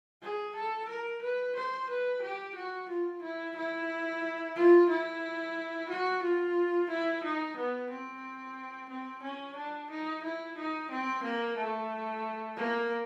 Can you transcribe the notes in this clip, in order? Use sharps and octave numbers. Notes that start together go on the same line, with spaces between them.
G#4
A4
A#4
B4
C5
B4
G4
F#4
F4
E4
E4
F4
E4
F#4
F4
E4
D#4
B3
C4
C4
C#4
D4
D#4
E4
D#4
C4
A#3
A3
A#3